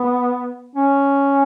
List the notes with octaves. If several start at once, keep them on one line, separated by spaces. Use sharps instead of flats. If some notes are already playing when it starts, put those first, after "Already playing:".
Already playing: B3
C#4